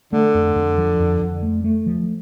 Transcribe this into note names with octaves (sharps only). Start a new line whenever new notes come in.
D3 A3
F2
F2
F3
F2
F2
A3
A3
F3